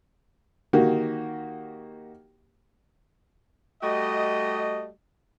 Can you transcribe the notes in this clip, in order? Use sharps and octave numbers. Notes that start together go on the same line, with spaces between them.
D#3 A#3 F#4 G4
G3 A3 F#4 G4 D#5